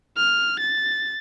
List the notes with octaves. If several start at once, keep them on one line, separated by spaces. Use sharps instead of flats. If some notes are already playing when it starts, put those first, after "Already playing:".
F6
A6